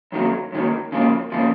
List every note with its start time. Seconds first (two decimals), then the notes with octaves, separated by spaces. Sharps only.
0.12 F#2 D#3 F#3 A#3
0.52 F#2 D#3 F#3 A#3
0.92 C#3 F3 A#3
1.32 C#3 F3 A#3